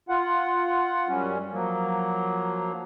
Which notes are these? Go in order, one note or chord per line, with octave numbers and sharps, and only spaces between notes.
F4 F#5
F#2 G3 C#4
F3 F#3 A#3